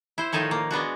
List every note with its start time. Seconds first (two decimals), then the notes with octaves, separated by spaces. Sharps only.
0.18 E4 C5
0.32 A2 D#3 F3 D#4 A4 C#5
0.51 A#3
0.71 G#3 B3 D4 F#4